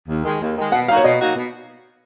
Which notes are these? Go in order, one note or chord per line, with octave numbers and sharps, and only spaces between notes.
D#2
D#3 G#3
D#2
D#3 G#3
B2 F#5
F#3 A#3 D#4 F#4 F5
C#5
B2 D#5
F#3 A#3 D#4 F#4
B2